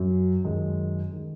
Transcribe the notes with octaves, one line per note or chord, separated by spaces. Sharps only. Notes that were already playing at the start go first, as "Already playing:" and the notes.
Already playing: F#2 F#3
F#2 D#3 G#3
D#3 G#3